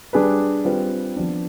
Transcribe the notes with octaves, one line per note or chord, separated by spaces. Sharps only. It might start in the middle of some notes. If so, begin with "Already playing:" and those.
G3 D4 G#4 B4
G3 C4 F4 B4
F3 B3 D4